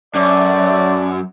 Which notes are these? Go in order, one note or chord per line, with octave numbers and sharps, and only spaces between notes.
F#2 A3 D5